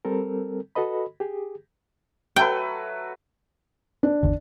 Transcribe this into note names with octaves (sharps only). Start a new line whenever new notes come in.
G3 C4 A4 A#4
F#4 A4 B4 D#5 B5
G4 G#4
F#3 A3 B4 G5
D4
G#1 E2 D3